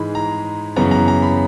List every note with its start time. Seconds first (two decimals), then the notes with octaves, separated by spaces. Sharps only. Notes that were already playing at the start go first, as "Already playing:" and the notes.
Already playing: G#2 E3 G#3 B5
0.15 A#5
0.76 F#2 C#3 E3 B3 A#5
0.91 A#5
1.08 A#5
1.22 B5